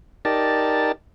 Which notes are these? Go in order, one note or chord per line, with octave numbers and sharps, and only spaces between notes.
D#4 G4 A#4 D5 A5